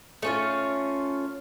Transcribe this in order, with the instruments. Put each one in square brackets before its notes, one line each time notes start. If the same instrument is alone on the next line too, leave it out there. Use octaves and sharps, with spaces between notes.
[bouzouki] A3 C#4 F4